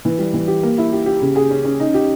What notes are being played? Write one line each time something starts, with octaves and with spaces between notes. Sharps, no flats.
E3
G3
E3
G4
A#3
E4
G4
G4
C#3
G#4
C#4
C#4
D#4
G4